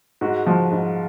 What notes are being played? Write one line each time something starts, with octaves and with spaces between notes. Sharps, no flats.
G#2 F#4
F3
G#2